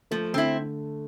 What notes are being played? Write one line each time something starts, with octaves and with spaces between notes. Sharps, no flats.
F3 A3
D3 C4 E4